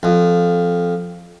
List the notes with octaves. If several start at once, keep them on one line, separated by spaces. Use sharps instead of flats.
F2